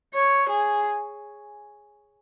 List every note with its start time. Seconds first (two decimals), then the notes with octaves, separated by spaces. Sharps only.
0.14 C#5
0.49 G#4